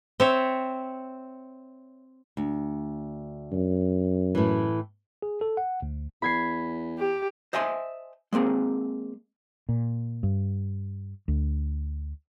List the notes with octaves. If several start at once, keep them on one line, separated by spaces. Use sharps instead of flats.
C4 C#5 E5
D2
F#2
A2 E3
G#4
A4
F#5
D2
E2 B5 G#6 C7
G4
C5 D#5 E5 G#5 A5 C6
G#3 A#3 C4 G#4
A#2
G2
D2